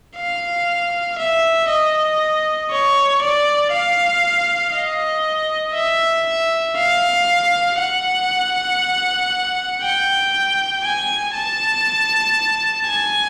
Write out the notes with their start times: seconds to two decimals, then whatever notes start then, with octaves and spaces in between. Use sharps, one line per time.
0.16 F5
1.18 E5
1.69 D#5
2.71 C#5
3.22 D5
3.73 F5
4.74 D#5
5.75 E5
6.76 F5
7.79 F#5
9.82 G5
10.84 G#5
11.35 A5
12.87 G#5